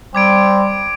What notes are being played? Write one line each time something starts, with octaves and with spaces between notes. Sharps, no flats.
G3 C4 D6 G#6 D7